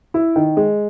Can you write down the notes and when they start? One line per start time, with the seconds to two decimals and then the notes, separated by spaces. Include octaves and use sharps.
0.14 E4
0.36 D#3
0.57 G#3